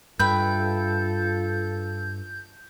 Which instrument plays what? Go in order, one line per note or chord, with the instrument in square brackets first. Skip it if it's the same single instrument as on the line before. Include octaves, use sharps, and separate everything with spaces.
[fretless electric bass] G2 [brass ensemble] F4 A4 [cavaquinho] B4 E5 G5 [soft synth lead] G6